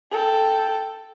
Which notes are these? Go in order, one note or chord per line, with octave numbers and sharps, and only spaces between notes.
A4 G5